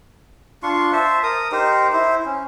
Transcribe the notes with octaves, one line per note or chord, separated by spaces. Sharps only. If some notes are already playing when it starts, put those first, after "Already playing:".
D4 F4 C6 C#6
C5 E5 A5
A#4 D#6
D#4 G4 A#4 C5
E4 C5
C#4